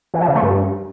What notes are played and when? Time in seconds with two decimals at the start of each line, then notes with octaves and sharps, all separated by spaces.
0.14 E3
0.21 F3
0.28 C#3
0.35 A3
0.42 G2